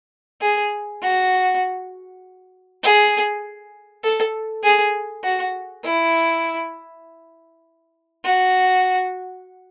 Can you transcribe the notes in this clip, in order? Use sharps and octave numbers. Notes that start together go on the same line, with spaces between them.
G#4
F#4
G#4
A4
G#4
F#4
E4
F#4